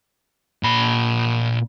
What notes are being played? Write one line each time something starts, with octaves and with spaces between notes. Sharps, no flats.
A#2 B5